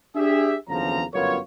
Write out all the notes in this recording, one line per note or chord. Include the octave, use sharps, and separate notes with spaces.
D4 G4 G#4 E5
F#1 E2 D3 F3 C#4 A#5
G1 F#2 B3 F4 A#4 C#5